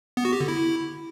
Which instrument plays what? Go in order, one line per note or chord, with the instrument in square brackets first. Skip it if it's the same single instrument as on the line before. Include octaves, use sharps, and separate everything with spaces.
[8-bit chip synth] B3
F#4
G4
D3
E4